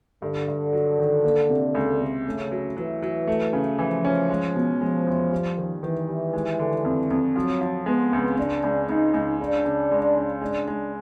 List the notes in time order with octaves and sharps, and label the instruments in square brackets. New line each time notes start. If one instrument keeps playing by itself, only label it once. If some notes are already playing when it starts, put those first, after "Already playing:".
[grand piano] G2 [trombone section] D3
[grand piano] G2
F#3
D#3
A#3
C3
C#2
C3
[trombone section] C#3 [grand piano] A3
[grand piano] F#3
[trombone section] E3 [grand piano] F#3
[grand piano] F#3
A3
C#3
[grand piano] E3 [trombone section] F3
[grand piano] C#4
G#3
B2
[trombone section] F3 [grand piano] G#3
[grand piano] E2
G3
D#3
[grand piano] D#3 [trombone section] E3
[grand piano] G3
G#3
D3
F2
F2
[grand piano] F3 [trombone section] F#3
[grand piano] F3
[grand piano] G#3 [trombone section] B3
[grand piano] C#2
[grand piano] C#2 [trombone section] D4
[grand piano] C#2
[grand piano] C#2 [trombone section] D#4
[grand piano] C#2
[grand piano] C#3 [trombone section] D4
[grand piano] C#3
G#3
C#3
[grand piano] G#3 [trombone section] D4
[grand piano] G#3